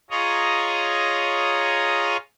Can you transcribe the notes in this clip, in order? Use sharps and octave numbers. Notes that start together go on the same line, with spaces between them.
F4 G#4 C#5 D#5 A#5